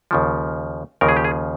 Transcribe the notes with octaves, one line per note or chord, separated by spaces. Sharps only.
D#2 C#3 F3
D#2 C#3 F3 A#4
G#4
G4
G#4